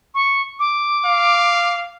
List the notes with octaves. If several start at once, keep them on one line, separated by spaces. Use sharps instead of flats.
C#6
D6
F5